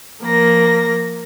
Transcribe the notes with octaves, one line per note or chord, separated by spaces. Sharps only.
F3 A#3 A#4 A#6